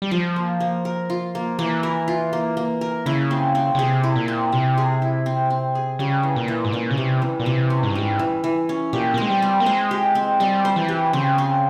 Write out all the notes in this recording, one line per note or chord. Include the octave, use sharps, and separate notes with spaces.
G3
F3 F4
A#3
A#3
A#4
F4
A#3
E3 A#3
A#4
F4
A#3
A#3
A#4
C#3 E4
C4
C4
C#3
C3 G#4
E4
A#2
C4
C3 C4
G#4
E4
C4
C4
G#4
C#3 G3
E3
A#2
E3
G#2
A#2 C#4
C#3
C3 G3
E3
A#2
C3 E3
C#4
G#2
G2
G#2 G3
E3
E3
C#4
A#2 G4
A#3
G#3 C4
G3
C4
A#3
G#3 C5
G4
C4
G3 C4
C5
E3
G4
C#3 C4
C4